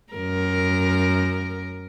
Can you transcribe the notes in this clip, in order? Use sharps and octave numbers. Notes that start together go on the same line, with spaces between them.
F#2 A#4